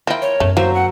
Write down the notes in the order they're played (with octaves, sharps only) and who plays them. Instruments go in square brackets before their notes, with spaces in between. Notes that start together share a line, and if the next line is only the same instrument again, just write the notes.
[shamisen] F3 E4 [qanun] A#4 G5
[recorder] C#5
[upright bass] F#2 B3 [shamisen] A3
[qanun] F#3 E5 [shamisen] A#3 [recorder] C5
[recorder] F#5